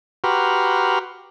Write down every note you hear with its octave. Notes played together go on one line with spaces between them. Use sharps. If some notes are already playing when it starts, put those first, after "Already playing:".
F#4 G4 B4 A#5 C6 F6